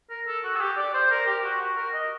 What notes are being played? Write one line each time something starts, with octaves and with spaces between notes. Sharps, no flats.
A#4
A4
F#4
A4
G4
D5
C5
A#4
G4
F#4
F#4
A#4
D#5